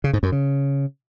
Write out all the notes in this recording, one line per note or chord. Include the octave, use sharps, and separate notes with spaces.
C#3
G#2
F#2
C#3